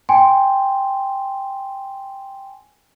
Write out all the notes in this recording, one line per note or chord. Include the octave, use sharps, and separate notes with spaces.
G5 G#5 C6